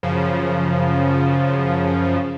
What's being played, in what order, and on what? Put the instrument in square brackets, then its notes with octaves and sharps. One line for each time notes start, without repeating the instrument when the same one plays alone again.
[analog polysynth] F#2 C#3 F3